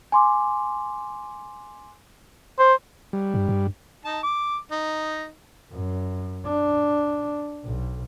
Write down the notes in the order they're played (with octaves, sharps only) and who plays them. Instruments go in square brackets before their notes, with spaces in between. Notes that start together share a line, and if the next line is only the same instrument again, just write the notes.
[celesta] G#5 C6 D6
[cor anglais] C5
[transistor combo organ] G3
[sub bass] G2
G2
[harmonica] D#4 A5
D6
D#4
[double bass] F#2
D4
B1